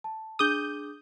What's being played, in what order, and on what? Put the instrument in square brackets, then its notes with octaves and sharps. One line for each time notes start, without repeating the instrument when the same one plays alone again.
[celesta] A5
[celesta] D4 G#4 D6 [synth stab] D#6 G6